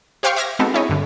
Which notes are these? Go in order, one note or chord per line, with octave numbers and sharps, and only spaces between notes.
G4 C5 F5 G5 C6 C#6
E5 D6 F6 G#6 A#6
G#3 B3 C4 D#4 F#4 A4
D4 E4 G#4 C#5 D#5
G2 D3